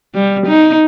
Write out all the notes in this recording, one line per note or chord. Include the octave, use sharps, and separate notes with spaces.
G3
D#4